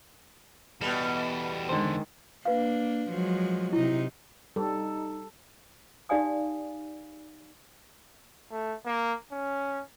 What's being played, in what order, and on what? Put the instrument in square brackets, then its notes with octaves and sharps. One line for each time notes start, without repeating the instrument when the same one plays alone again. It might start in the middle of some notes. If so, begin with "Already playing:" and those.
[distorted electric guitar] E2 A4 [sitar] B2 G3 [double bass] B3
[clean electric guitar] D3 C5 [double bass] D#3 G#3
[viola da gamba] A#3 D4 [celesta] B4 F5
[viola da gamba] F3 F#3 G#3
[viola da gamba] C3 D#4 [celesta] E4
[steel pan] G3 [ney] D#4 [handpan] A4
[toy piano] D#4 G4 D5 F5 G#5 D#6
[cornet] A3
A#3
C#4